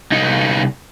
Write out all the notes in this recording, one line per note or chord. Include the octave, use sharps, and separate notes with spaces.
C2 D#4